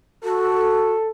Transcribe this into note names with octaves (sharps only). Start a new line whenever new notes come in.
F#4 A4